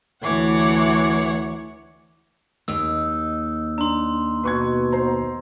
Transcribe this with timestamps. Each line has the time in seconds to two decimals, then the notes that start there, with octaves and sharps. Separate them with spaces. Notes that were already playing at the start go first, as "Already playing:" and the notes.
0.24 D2 E3 C#5 F#5 D6
2.68 D#2 D#4 E6
3.78 D4 A#5 C6
4.43 B2 B4 C#6 G#6
4.92 C5 A#5